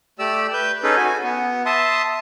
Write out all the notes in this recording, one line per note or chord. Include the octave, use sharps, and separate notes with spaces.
A3 G4 D5 E6
B4 G6
C#4 D#4 G#4 A4 B4
F#4 G#5
B3
E5 A5 C6 D#6